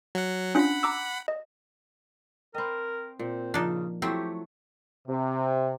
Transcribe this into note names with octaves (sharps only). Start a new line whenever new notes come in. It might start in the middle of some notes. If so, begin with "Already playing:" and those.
F#3 F#5
C#4 D4 F4 F#5 B5
A#5 D6 E6
D#5
C4 A#4 D#5 G5 B5
A#2 C4
C#3 F3 D4 D#4 F4
F#3 A3 C4 E4 G4
C3